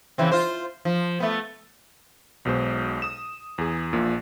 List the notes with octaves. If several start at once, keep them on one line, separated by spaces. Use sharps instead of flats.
C#3 E3 C4
F4 C5
F3
A3 B3
B1 B2 G#3 C5
D#6 E7
E2 G#4
A#1 A#2